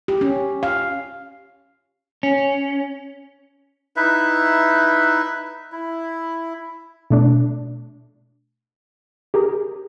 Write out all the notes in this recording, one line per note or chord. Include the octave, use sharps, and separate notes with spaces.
G4
C#4
F5
C#4
D#4 E4 B4 E5
E4
B2 A3 D4
G4 G#4 A#4